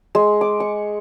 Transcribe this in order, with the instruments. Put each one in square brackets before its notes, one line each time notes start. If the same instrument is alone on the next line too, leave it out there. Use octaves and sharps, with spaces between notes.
[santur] G#3
D6
C#6